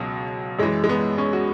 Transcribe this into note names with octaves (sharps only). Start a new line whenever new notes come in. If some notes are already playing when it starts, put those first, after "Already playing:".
Already playing: C#2 B2 F#3
F#2 E3 G#3
G#3
B3
C#4
F#4